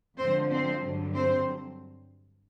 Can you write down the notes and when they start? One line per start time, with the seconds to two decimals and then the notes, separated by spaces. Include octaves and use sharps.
0.18 F2 D3 F3 G#3 C4 C5
0.50 C4 C5
0.82 G2 D3 F#3
1.14 C4 C5